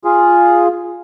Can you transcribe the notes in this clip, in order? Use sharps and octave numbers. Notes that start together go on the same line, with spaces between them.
F4 G#4